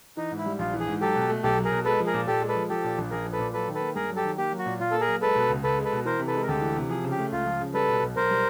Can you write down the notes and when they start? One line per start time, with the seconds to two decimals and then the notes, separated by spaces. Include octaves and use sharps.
0.17 E3 D#4
0.31 G#2
0.38 E4
0.46 G3
0.59 A#1 F4
0.74 E3
0.80 G#4
0.87 G#2
1.01 F#3 G4 A4
1.16 B2
1.29 A3
1.43 B1 G4 A4
1.58 F#3
1.64 G#4 A#4
1.71 B2
1.85 G#3 A4 B4
2.00 F3
2.06 G#4 A#4
2.14 A#2
2.27 A#2 G4 A4
2.41 G#3
2.48 A4 B4
2.55 F3
2.69 F3 G4 A4
2.84 A#2
2.98 A#1
3.11 A#1 G#4 A#4
3.26 F3
3.32 A4 B4
3.39 A#2
3.53 F#3 A4 B4
3.68 D#3
3.75 A4 B4
3.81 A#3
3.95 G2 G#4 A#4
4.10 F#3
4.16 G4 A4
4.24 D#3
4.37 A#3 G4
4.52 F#3
4.59 F#4
4.66 A#2
4.80 A#2 F4
4.91 A#3 A4
5.01 G#4 A#4
5.08 F#3
5.21 G#3 A4 B4
5.35 B2
5.50 C#2
5.63 C#2 A4 B4
5.78 G#3
5.84 A4 B4
5.92 B2
6.05 E3 A#4 C5
6.19 C3
6.27 A4 B4
6.34 G#3
6.42 A#4
6.48 D2 G4 A4
6.61 E3
6.76 C3
6.89 F3 G#4
7.04 C#3
7.11 G4
7.19 A3
7.32 C#2 F4
7.45 F3
7.60 C#3
7.74 G3 A4 B4
7.89 B2
8.03 B1
8.16 B1 A#4 C5
8.31 G3